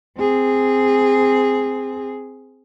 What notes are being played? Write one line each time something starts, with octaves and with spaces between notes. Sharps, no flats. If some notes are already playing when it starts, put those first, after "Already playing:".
C4 G#4